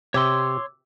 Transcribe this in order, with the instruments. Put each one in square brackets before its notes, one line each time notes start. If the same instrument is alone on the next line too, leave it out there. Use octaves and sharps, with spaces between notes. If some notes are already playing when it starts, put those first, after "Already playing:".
[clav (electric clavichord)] C3 G4 [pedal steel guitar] C#5 C6 [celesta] D6 E6